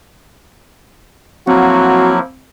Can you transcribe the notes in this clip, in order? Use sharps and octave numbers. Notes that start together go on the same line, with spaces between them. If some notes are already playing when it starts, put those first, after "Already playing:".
F3 F#3 A#3 C4 E4 F#4